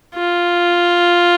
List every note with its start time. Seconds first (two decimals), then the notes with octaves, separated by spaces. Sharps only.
0.15 F4